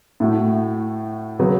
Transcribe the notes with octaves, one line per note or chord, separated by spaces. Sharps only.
A2 A3 F#4
C#3 F#3 B3